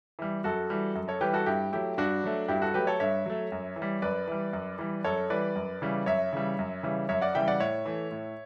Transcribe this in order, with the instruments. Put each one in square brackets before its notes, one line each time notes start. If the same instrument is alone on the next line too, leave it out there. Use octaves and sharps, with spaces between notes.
[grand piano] E3 G3
F#2 F#4 A4
E3 G3
F#2
A4 C#5
E3 G3 G4 B4
F#4 A4
G2 E4 G4
F#3 A3 E4 G4
G2 D4 F#4
F#3 A3
G2 E4 G4
F#4 A4
F#3 A3 G4 B4
A4 C#5
G2 C#5 E5
F#3 A3
F#2
E3
G3
F#2 B4 D5
E3 G3
F#2
E3 G3
F#2 A4 C#5
E3 G3 B4 D5
F#2
C#3 E3 G3
F#2 C#5 E5
C#3 E3 G3
F#2
C#3 E3 G3
F#2 C#5 E5
D5 F#5
C#3 E3 G3 E5 G5
D5 F#5
A2 C#5 E5
E3 A3
A2